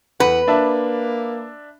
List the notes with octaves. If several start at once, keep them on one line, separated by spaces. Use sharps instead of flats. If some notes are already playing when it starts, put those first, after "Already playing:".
E2 B4 F#5
A#3 D4 E5 A5